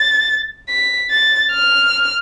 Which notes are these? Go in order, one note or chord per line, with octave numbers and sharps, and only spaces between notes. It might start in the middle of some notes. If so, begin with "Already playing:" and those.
Already playing: A6
B6
A6
F6